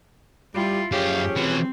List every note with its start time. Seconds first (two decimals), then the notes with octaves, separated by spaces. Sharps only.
0.54 G3 E4 F4
0.92 F#2 F3 C#4 G4 G#4 F5
1.36 E3 C4 F#4